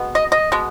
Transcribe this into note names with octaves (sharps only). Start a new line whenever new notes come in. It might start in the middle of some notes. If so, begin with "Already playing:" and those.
Already playing: B2 G#3 B3
D#5
D#5
B2 G#3 B3